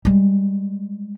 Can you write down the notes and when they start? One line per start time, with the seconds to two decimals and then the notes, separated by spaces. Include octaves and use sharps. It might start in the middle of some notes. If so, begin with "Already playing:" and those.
0.05 G3 G#3